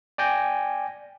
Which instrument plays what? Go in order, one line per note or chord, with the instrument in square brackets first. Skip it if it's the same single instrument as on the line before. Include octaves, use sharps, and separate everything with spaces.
[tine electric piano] D5 G5 G#5 G6 A#6